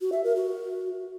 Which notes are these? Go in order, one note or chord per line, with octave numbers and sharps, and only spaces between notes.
F#4
E5
A#4
F#4